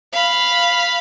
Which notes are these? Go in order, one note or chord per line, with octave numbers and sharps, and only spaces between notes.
F5 B5